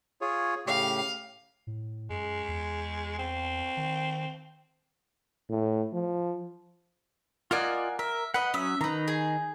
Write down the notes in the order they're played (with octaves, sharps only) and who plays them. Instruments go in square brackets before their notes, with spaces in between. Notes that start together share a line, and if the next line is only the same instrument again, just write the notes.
[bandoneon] F4 G#4 C#5
[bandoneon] A2 C#3 G4 [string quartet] F5
[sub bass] A2
[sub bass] F#2 [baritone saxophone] G#3
[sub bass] E2
[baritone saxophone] C4
[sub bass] D#3
[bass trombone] A2
F3
[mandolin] A#3 F#5 G#5 [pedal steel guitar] F4 D5 D#5
[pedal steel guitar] A#4 [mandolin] E5
[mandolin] B4 D#5 [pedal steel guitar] F#5
[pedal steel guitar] F#3 C#4 D#6 [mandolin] E5
[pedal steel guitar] D#3 D#4 [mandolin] B4 A#5
[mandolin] G#4